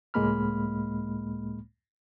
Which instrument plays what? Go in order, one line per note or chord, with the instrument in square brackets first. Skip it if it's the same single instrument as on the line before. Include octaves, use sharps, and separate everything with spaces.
[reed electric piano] C#2 A2 G#3 A#3 B5 F6